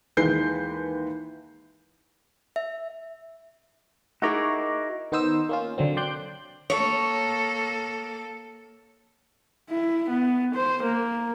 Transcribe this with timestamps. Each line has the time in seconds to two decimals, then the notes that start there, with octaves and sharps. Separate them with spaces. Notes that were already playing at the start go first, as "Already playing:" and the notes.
0.17 D#2 E3 G#3 B4 G6 C7
2.56 E5
4.22 D#4 E4 F#4 G#4 A#4 E5 C#6 D6
5.12 D#3 B3 D#4 C5 D#6 E6
5.49 A#3 C#4 F4
5.78 D3 F#3 C4
5.97 D5 G5 C6 F#6 G6
6.70 A#3 A4 C#5
9.70 E4
10.10 B3
10.55 C5
10.83 A#3